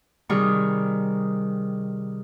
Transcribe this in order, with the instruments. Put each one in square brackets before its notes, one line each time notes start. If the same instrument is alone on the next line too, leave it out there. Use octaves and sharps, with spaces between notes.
[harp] C3 D#3 G3 G#4 C#6